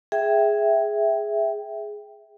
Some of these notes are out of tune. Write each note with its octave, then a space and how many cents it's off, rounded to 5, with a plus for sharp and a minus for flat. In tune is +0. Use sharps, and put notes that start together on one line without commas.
G#4 +0 E5 +0 G5 +0